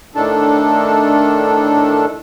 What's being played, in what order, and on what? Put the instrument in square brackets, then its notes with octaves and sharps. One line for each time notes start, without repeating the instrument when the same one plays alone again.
[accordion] A2 D#3 D4 A4